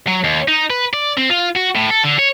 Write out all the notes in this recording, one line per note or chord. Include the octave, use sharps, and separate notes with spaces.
F#3
D#2
D#4
B4
D5
C4
F4
F#4
A2
A4
D3
C#5